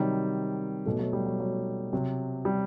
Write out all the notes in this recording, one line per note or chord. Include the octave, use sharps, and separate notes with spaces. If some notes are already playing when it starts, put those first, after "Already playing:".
Already playing: C3 D#3 F#3 G3
B2 F#3 A3
F#3 A3
G3
F#3
F#3
C3 F#3
G3